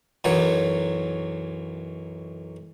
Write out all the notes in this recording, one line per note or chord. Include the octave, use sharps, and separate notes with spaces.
B1 F#2 E3 F#3 C#5